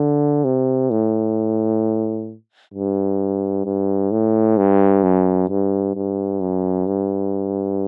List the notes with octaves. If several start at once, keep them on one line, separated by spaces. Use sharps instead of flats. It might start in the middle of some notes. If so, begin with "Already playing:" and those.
Already playing: D3
C3
A2
G2
G2
A2
G2
F#2
G2
G2
F#2
G2